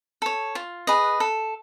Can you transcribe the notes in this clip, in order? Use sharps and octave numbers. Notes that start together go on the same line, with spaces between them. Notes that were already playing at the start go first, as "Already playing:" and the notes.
A4 C#5
F4
G#4 B4 D#5
A4